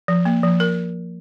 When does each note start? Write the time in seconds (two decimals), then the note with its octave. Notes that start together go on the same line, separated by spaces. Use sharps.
0.08 F3
0.25 A#3
0.43 F3
0.60 A#4